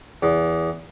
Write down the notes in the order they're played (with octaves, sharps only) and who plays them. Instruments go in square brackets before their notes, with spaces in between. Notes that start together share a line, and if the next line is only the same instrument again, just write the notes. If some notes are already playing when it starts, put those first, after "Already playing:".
[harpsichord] E2